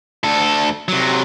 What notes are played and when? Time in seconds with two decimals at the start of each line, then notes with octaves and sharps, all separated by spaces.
0.23 D2 A4
0.88 C3 F#3